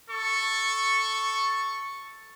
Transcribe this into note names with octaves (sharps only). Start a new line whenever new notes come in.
A4 C#6